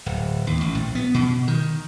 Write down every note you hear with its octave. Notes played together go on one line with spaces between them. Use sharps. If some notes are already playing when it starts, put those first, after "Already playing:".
D1
D#2
A1
A#1
B3
B2
D#3